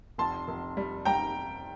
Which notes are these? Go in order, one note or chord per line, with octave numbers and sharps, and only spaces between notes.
F1 A5 C6
F1
G3
G3 G5 A#5